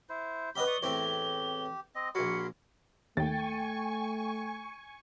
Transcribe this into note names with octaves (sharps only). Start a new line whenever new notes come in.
E4 C5
B3 C#4 G4 B4 D#5 B5 G7
D5 C#6 D#6
E2 A2 C4 G4
C4 D#5 A#6
A#1 F#3 A#4 B5 C6 C#7
D#2 A3 G5 G#5 C#6 A6